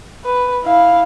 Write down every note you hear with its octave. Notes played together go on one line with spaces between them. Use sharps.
B4
E4 F5